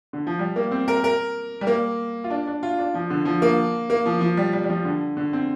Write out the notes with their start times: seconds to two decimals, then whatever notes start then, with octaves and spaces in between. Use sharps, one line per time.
0.13 D3
0.27 F3
0.39 G3
0.56 A#3
0.71 C4
0.88 A#4
1.04 A#4
1.61 G3
1.67 A#3
2.24 F4
2.30 D4
2.47 D4
2.63 F4
2.78 D4
2.94 F3
3.10 D3
3.25 F3
3.42 A#3
3.90 A#3
4.06 F3
4.21 F3
4.37 G3
4.53 G3
4.64 G3
4.70 F3
4.85 D3
5.17 D3
5.33 C4